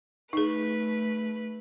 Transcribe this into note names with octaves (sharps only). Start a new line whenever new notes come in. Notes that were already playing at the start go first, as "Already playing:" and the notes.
A3 D#4 G#4 B4